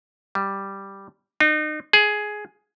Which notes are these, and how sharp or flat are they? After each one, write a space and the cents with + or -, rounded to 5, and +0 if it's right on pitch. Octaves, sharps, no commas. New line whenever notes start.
G3 +0
D#4 -35
G#4 +10